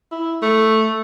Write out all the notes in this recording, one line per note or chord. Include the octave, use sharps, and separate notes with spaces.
E4
A3